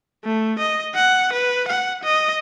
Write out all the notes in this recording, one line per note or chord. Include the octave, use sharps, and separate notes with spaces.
A3
D#5
F#5
B4
F#5
D#5